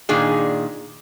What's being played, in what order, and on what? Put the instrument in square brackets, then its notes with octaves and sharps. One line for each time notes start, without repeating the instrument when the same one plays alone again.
[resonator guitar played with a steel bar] A#2 D#3 D4 G#4